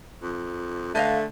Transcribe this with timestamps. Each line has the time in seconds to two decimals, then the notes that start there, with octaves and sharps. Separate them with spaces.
0.22 F2
0.95 D3 A3 B4 D#5 F5